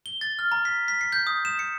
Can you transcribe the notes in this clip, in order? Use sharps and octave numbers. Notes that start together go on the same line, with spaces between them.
G7
A6
F6
A#5
B6
B6
C7
G6
D#6
E7
C#7